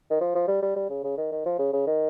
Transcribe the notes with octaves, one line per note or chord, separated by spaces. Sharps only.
D#3
F3
F3
G3
G3
G3
C#3
C#3
D#3
D#3
F3
C#3
C#3
D#3